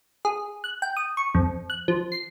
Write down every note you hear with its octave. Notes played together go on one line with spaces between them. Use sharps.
G#4
F#6
G5
D#6
C#6
F2
F#6
F3
C7